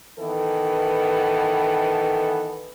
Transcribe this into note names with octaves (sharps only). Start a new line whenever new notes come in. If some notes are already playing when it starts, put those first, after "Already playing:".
D#3 E3 B3 A4